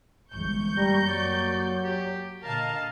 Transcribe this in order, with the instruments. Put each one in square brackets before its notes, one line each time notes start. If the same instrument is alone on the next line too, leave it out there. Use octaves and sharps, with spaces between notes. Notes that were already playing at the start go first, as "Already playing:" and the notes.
[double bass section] G1 E3 G#3 [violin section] C#6 G6
[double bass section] F#2 A#3 [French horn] G3 [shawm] A#5
[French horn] F#3 [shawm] D5
[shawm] G4
[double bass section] A#2 D3 [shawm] A#4 [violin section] D#5 F5 A5